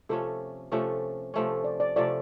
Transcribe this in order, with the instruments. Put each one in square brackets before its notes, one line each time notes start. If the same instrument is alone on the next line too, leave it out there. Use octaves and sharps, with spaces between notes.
[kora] C3 F3 A3 C#4 [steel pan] A4
[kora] C3 F3 A3 C#4
C3 F3 A3 C#4
[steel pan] C5
D5
D5
[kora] C3 F3 A3 C#4 [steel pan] D5